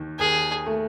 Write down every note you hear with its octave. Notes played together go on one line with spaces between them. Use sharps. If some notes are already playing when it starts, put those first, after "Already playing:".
Already playing: D#2 D#3
D#2 G#4
A3